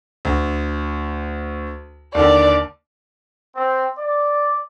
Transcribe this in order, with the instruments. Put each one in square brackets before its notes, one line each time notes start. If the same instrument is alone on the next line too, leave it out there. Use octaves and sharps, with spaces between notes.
[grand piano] D2
[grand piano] D#2 D3 [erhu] D5
[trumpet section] C4
D5